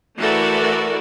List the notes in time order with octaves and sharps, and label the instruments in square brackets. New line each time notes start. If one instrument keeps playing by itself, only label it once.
[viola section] E3 A3 F#4 A4 A#4 D5